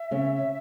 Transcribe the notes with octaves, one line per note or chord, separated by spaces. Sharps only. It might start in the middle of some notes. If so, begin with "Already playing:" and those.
Already playing: E5
C#3 C#4